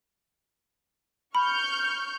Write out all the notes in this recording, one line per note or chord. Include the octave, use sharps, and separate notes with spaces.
B5 C#6 F6 G6